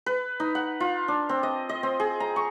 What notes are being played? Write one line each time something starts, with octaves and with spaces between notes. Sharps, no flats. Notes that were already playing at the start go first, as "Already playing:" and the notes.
B4
D#4
F#5
F4
D4
C4
D#5
D#5
C4
G#4
A#5
C#6